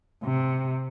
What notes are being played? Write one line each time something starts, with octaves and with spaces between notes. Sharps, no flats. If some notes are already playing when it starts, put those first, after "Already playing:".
C3